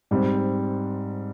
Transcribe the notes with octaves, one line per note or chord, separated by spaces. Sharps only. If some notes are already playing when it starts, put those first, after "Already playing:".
G#2 G3 C4